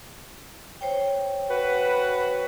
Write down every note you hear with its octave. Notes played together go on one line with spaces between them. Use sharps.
C5 C#5 G5
F#4 B4